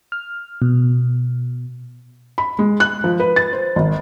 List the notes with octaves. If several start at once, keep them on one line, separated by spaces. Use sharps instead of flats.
F6
B2
B5
G#3
F#6
F3
B4
A6
C5
G#1